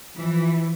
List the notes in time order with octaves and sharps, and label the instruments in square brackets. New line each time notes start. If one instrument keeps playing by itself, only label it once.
[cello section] E3 [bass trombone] F3